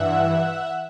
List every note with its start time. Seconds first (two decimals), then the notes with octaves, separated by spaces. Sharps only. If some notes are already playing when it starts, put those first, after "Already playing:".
Already playing: G2 E3 E5 F#5